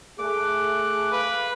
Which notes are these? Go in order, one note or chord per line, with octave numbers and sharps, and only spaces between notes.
A3 G#4 D6 F#6
B4 F5